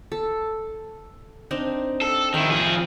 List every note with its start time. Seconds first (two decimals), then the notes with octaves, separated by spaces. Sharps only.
0.12 A4
1.51 C4 D4 D#4
2.02 A4
2.34 D#3 E4 G5
2.51 F3 G#4